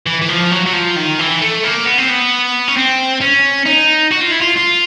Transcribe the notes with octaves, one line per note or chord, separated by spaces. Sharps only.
E3
E3
F3
F#3
F#3
F3
D#3
E3
A3
A#3
B3
C4
B3
C#4
C4
C#4
D#4
F#4
F4
E4
F4
F4